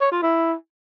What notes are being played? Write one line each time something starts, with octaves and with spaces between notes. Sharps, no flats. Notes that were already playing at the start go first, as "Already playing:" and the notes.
C#5
F4
E4